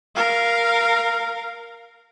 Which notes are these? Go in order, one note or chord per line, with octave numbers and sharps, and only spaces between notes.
A#4 F5